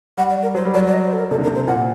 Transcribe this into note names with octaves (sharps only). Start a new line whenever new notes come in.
G3 F#5
D5
A#4
F#3 C5
G3
F#3 D5
D5
D#5
C5
A4
A#4
C3 A4
D3
A#4
C3
C5
A#2 F#5